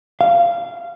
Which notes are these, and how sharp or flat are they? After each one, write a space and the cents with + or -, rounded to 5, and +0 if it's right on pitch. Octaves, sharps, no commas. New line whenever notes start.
F5 -20